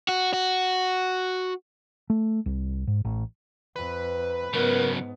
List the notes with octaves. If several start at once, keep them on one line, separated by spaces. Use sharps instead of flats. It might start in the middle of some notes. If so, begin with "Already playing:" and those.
F#4
F#4
A3
C2
G#2
A1
F2 B4
G#2 C#3 F#3 B3 A#4